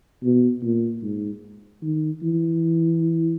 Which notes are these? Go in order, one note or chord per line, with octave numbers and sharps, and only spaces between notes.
B2
A#2
G#2
D#3
E3